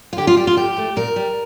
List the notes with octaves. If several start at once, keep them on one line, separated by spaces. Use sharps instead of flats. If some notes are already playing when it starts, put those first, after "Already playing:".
F4
D3 G4
F4
G3 G4
F4
A2 G4
F3 A3
A#2 A#4
G3